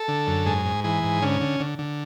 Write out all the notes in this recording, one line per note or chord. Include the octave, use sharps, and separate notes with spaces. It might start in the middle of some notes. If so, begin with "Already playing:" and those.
Already playing: A4
D3
F#2
G#2 G#4
G#2
E3 G#4
G#2
D3 C#4
D3
D3
D3